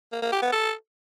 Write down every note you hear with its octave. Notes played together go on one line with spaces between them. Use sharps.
A#3
A#3
G4
B3
A4